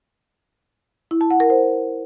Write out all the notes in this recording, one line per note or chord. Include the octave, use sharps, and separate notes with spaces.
E4
A5
F#5
A#4
C5